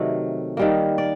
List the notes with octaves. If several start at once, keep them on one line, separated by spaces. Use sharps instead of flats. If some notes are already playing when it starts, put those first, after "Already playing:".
Already playing: C3 D#3 F#3 A3 D5
D#3 G3 A#3
D5